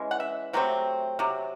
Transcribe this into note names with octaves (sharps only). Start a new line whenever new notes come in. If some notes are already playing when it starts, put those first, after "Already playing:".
Already playing: E3 G#3 C#4
F#5
E5
C3 F#3 A3 C4
C3 F#3